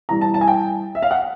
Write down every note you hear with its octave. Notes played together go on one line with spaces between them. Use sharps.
A2 E3 G3 A#5
A5
A5
G#5
G5
E5
F5
F#5